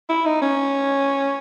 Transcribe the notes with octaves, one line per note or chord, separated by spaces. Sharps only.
E4
D#4
C#4